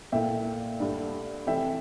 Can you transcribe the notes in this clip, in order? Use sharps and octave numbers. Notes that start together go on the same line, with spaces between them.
A#2 A3 E4 E5 G5
G2 D3 A3 D4
C3 E3 A3 E5 G5